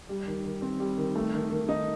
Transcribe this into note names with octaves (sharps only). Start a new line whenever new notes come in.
G3
D#3
D#3
C4
G3
D#3
A3
D#3
D#3
D#4